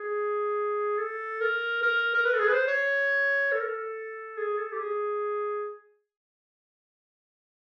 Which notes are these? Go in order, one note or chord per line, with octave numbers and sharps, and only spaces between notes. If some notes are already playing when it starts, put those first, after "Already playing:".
Already playing: G#4
A4
A#4
A#4
A#4
B4
A4
G#4
B4
C5
C#5
A4
A#4
A4
G#4
A4
G4
G#4